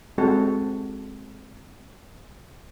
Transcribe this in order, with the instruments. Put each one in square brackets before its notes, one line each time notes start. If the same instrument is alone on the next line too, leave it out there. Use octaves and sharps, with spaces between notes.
[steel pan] G#3 C4 F#4 A4 C5